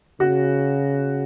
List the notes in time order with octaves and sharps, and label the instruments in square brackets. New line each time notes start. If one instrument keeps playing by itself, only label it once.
[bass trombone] C#3 [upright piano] F#4